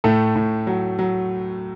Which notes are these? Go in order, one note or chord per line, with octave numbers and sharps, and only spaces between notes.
A2 A3 A4
A2
F#3
F#3